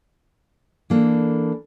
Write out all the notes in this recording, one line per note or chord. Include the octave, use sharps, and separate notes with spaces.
E3 A#3 D4 A4